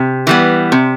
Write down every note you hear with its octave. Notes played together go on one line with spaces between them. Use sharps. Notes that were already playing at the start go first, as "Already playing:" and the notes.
Already playing: C3
E3 G3 B3
C3